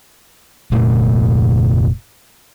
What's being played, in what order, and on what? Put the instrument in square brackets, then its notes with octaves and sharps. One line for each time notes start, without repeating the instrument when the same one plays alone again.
[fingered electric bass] F1 A#2 A3